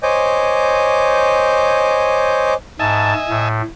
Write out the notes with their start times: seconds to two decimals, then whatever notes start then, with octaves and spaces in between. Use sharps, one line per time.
0.03 C5 C#5 D#5 G#5 D6 G6
2.79 G#2 D#5 E5 G#5 A5
3.29 A2